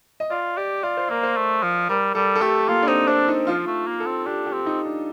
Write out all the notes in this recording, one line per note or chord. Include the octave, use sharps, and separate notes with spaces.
D#5
F4 D5
G4 D5
F4 D5
C5
A#3 A#4
C5
A3
F3
G3 A#4
G3 A4
A4
A3 G4
A#3 F4
D4
C4 D#4
C4 D4
D#4
F3 F4
A3
A#3
A4
C4
D4 G4
G4
C4
D#4
D4